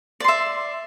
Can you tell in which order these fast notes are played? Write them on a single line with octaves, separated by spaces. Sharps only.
D5 C6 E5